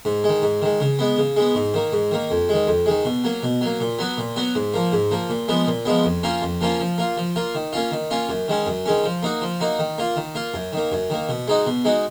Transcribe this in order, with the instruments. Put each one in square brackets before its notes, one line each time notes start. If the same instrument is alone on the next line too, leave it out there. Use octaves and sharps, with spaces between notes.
[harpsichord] G#2
D#3 G#3
G#2
D#3 G#3
C#3
G#3 B3
C#3
G#3 B3
G#2
D#3 A#3
G#2
D#3 A#3
F2
D#3 G#3
F2
D#3 G#3
B2
F#3 A#3
B2
F#3 A#3
A#2
F#3 B3 F#4
A#2
F#3 B3 F#4
G#2
F3 A#3
G#2
F3 A#3
A#2
F3 G#3 B3
A#2
F3 G#3 B3
F2
F3 A#3 C#4 F4
F2
F3 A#3 C#4 F4
F3
A#3 F4
F3
A#3 F4
D#3
A#3 C#4 F4
D#3
A#3 C#4 F4
F#2
D#3 G#3 C#4
F#2
D#3 G#3 C#4
F3
A#3 D#4 F#4
F3
A#3 D#4 F#4
D#3
A#3 F4
D#3
A#3 F4
F#2
D#3 A#3
F#2
D#3 A#3
B2
G#3 D#4 F#4
B2
G#3 D#4 F#4